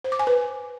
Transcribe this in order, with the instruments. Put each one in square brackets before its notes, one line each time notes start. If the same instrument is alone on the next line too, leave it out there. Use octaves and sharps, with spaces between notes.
[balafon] C5
D6
G#5
B4